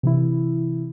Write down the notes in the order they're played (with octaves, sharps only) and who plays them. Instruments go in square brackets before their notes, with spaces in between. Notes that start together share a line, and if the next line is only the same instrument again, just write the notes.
[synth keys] C3 E3 E4